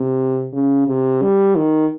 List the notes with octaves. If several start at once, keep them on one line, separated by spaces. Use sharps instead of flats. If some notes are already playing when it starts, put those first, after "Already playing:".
Already playing: C3
C#3
C3
G3
D#3